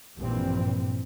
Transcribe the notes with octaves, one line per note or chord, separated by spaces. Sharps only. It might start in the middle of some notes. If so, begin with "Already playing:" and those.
A#1 G2 A#2 E3 C4